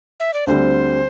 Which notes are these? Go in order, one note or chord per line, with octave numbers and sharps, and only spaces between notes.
E5
D5
D2 D3 G3 C4 C5